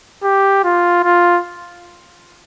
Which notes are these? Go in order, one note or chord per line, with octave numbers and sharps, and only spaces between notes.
G4
F4
F4